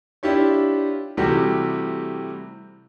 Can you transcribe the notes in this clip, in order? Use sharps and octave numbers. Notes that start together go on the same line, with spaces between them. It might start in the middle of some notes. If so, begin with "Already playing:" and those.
D4 E4 F4 G4 C#5
C3 E3 G3 A3 F#4 G4